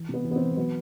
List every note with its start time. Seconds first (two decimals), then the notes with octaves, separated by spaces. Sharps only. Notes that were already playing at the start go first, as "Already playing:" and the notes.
Already playing: E3
0.09 C3 B3
0.25 E3
0.31 B3
0.36 C4
0.41 E3
0.57 F#3 B3